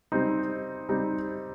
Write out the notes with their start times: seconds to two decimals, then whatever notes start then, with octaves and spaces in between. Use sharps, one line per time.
0.12 G3 C4 D#4
0.89 G3 C4 D#4